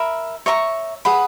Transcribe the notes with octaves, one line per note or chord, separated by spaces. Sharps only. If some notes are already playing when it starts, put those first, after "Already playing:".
Already playing: A#4 E5 B5
C#5 E5 A#5 C#6
G#4 B4 F#5 B5